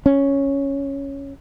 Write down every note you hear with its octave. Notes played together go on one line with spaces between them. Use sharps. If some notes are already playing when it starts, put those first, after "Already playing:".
C#4